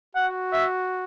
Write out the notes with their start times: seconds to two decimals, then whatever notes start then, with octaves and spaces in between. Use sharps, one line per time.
0.15 F#4 F#5
0.53 E5